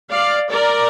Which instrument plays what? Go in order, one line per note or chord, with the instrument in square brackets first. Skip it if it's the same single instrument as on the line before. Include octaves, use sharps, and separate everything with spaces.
[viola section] D5 F5
A#4 D5